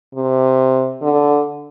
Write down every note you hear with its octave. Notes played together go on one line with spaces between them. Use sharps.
C3
D3